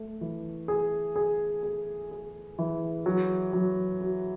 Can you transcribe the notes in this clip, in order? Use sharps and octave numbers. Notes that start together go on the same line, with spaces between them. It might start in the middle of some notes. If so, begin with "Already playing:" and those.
Already playing: A3
E3
G#4
G#4
G#4
G#4
E3
F#3
F#3
F#4